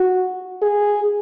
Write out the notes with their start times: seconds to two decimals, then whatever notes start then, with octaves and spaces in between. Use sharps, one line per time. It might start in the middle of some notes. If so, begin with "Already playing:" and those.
Already playing: F#4
0.62 G#4